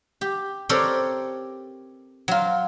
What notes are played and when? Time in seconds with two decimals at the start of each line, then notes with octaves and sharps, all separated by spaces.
0.21 G4
0.69 C4 G4 A4 A#4 C#5 D5
2.28 F#3 F4